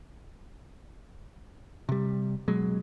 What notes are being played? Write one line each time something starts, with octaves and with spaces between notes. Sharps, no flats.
C3 G3
B2 F#3 G#3